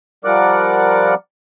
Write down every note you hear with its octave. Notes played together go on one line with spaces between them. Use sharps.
F3 G3 A#4 D5 F#5 D6